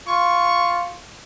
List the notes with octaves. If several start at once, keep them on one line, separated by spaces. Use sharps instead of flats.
F4 C#6